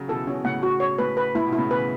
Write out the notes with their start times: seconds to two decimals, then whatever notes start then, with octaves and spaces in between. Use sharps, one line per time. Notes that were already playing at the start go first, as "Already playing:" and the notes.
Already playing: C#3 F#3
0.08 B2 E3 A4
0.27 B2 E3 C#4
0.44 A2 C#3 F#5
0.63 F#4
0.80 C#5
0.98 A2 B4
1.17 B4
1.35 A2 E4
1.47 B2
1.53 E4
1.59 A2 C#3
1.71 B2 E3 B4